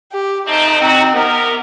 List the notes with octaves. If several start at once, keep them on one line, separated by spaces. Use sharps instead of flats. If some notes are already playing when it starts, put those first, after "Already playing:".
G4
F3 A3 C4 D#4
E3 F#3 C4 F#4
C3 B3 A#4